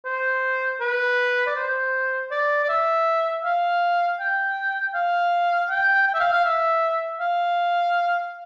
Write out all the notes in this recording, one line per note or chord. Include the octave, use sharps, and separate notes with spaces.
C5
B4
D5
C5
D5
D5
E5
F5
G5
F5
G5
G5
E5
F5
F5
E5
F5